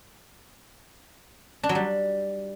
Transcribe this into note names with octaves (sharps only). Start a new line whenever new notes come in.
D4
F#3
G3